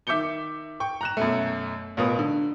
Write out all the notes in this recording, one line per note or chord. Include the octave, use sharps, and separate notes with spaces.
D#3 E5 D6 G6 C#7 G7
G5 C#6
A#5 F#6 E7
F#2 B2 A3
A1 B2 F4 A#4 B4 D#6
D3